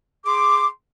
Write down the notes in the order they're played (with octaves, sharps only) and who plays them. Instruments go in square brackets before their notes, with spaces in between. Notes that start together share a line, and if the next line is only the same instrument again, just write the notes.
[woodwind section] G#4 C6 D6